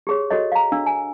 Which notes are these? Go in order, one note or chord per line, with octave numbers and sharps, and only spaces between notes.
G4 G#4 C#5
F#4 G4 A4 C#5 D#5
F5 A#5
D4 F5 E6
G#5